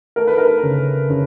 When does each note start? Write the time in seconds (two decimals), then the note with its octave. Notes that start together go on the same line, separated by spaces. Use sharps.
0.16 A3 A#4
0.27 B4
0.38 A#4
0.63 C#3
1.10 C#3